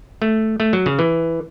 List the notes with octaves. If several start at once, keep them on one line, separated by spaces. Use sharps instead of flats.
A3
A3
F#3
C#3
E3